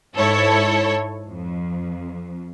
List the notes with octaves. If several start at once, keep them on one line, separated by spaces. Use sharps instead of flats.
G#2 E4 A4 C#5
F2